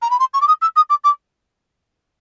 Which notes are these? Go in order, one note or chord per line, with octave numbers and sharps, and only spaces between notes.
A#5
B5
C6
C#6
D6
D#6
E6
D#6
D6
D6